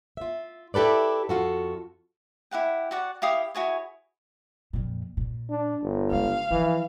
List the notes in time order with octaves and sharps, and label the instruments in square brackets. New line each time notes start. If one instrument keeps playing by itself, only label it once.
[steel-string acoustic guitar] F4 E5
E4 G4 A4 B4 D5
F2 F4 F#4 A4
[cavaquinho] E4 G4 F#5 G5
F#4 D5 F#5
E4 G4 F5 D#6
E4 F#4 G#4 C#5
[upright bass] F2 A#2
A#2
[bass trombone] D4
G1
[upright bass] C#3 G#3 [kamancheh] F5
[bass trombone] E3 [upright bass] F3